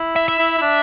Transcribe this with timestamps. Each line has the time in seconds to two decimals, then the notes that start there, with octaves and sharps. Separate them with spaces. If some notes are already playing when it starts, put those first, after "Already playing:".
Already playing: E4
0.16 E5
0.28 E5
0.39 E4
0.58 E4
0.62 D4